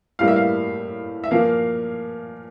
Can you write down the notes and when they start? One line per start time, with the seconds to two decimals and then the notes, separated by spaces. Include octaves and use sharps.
0.19 A2 G3 A#3 F5
0.28 E5
0.36 F5
1.24 E5
1.31 A#2 F3 A#3 F5